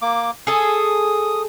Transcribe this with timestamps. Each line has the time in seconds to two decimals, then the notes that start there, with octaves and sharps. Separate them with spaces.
0.02 A#3 D6
0.47 G#4 A4 D#6